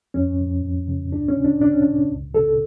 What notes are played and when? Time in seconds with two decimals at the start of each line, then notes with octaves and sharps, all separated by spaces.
0.14 F2 C#4
0.38 F2
0.63 F2
0.88 C#3
1.12 D2 D4
1.28 C#4
1.37 C#3
1.45 D4
1.61 C#3 D4
1.72 C#4
1.82 C#3 D4
2.10 C#2
2.34 C#3 A4